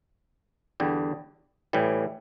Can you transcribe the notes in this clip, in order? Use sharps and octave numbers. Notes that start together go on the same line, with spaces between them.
E2 D3 G3
A2 E3 G3